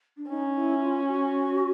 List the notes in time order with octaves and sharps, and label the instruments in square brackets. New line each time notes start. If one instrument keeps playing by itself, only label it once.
[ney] D4
[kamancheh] C#4 [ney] D#4
[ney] E4
F4
F#4